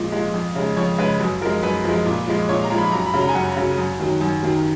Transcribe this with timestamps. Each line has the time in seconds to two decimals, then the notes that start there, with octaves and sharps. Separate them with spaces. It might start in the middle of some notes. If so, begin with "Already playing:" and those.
Already playing: A#2 F3 G#3
0.12 F3 G#3
0.34 F2
0.55 C#3 G#3
0.77 F2 C#5
0.98 C#3 G#3 B4
1.20 F#2
1.41 F3 G#3 A#4
1.63 F#2 B4
1.84 F3 G#3
2.06 A#2
2.27 F3 G#3
2.49 A#2 C#5
2.64 A#5
2.70 F3 G#3
2.78 B5
2.92 F#2 A#5
3.06 B5
3.14 C#3 F#3
3.21 A#5
3.29 G#5
3.35 F#2 F#5
3.57 C#3 F#3
3.78 F#2
3.99 D#3 F#3
4.21 F#2
4.43 D#3 F#3